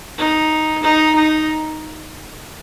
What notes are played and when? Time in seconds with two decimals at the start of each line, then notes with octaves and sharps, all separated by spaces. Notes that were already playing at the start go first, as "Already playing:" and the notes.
0.18 D#4
0.83 D#4
1.15 D#4